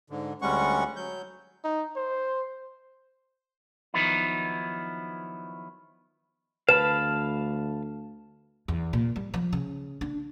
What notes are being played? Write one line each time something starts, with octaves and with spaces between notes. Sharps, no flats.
G#2 D3
D2 G3 G#3 C#4 F#5 C#6
F#3 G6
D#4
C5
D#3 F3 F#3 B3 D#4 E4
D2 B4 F5 A5 B5 E7
E2
A#2
G3
F3
C#3
D4